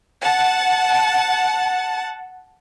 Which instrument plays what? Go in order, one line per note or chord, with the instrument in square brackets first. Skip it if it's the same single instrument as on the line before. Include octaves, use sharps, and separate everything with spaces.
[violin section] F#5 A5